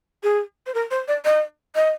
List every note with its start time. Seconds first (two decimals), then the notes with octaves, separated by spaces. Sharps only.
0.23 G#4
0.66 C5
0.74 A#4
0.91 C5
1.08 D5
1.25 D#5
1.75 D#5